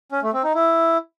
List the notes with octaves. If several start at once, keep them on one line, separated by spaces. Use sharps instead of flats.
C#4
A3
C4
D#4
E4